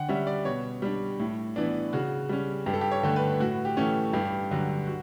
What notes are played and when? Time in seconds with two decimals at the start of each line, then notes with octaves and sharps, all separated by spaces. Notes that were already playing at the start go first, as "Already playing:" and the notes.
Already playing: D3 F#5 G5
0.09 G3 C#4 E5
0.27 D5
0.45 B2 C#5
0.82 G3 D4
1.19 A2
1.56 E3 B3 D4
1.93 C#3 F#4
2.29 G3 C#4
2.66 G2 G4
2.74 A4
2.81 G4
2.91 C#5
3.03 D3 A3
3.16 B4
3.40 A2 F#4
3.65 G4
3.77 E3 A3 C#4
4.13 G2 G4
4.51 D3 F#3
4.87 F#4